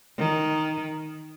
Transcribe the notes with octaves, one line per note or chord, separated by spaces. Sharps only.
D#3